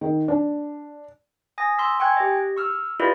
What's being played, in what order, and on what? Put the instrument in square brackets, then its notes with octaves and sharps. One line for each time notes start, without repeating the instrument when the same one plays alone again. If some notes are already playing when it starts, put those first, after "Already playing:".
[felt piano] D#3
D4
[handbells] G#5 D#6 A#6
C6 E6 B6
G5 G#5 C#6 F#6 G#6
G4 D#5
C#6 E6 F6
E4 F4 G4 B4 D5 D#5